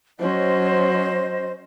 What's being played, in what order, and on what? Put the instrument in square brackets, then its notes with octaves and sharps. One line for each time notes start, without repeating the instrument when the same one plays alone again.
[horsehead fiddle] F#3 C#4 [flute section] C5 D#5